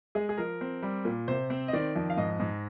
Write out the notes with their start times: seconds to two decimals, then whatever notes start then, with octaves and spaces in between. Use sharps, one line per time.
0.15 G#3 G#4
0.29 G#4
0.38 F3 A#4
0.61 C4
0.83 G3
1.05 A#2
1.28 C3 C5
1.50 C4
1.68 D#5
1.73 D#3 D5
1.96 F2
2.10 F5
2.17 G#2 D#5
2.40 G#2